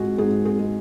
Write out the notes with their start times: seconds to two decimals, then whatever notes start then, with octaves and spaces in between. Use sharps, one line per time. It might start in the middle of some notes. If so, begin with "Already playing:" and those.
Already playing: G#2 G#3 F#4 G#4
0.18 G#2 G#4
0.45 G#4
0.59 G#3